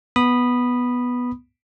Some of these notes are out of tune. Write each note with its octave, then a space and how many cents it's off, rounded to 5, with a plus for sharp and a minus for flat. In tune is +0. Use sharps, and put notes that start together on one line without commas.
B3 -5 B5 -5 D#6 -15